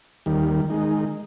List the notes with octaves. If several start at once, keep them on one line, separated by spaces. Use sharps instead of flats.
D#2 D#3 G3
D#3 G#3 D#4